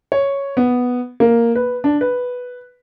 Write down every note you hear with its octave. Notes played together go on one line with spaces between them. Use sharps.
C#5
B3
A#3
B4
D4
B4